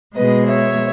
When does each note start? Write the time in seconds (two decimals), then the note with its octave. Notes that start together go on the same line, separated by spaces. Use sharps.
0.15 B2 G#3 B4 D#5
0.46 C#5 E5